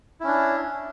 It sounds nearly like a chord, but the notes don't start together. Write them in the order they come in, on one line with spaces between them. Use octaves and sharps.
E4 C#4 D4